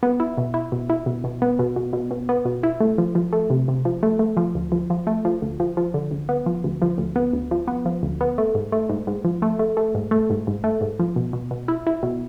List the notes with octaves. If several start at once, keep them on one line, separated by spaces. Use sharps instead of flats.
B3
E4
B2
E4
B2
E4
B2
B2
B3
B2
B2
B2
B2
B3
B2
E4
A3
F3
F3
A3
C3
C3
F3
A3
A3
F3
D2
F3
F3
A3
F3
D2
F3
F3
D3
D2
B3
F3
D2
F3
D2
B3
D2
F3
B3
F3
D2
B3
A3
G#2
A3
G#2
G#2
F3
A3
A3
A3
G#2
A3
G#2
G#2
A3
G#2
F3
B2
B2
B2
E4
E4
B2